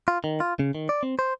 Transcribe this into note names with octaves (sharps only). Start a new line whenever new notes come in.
F4
D#3
F4
C#3
D#3
D5
C4
C5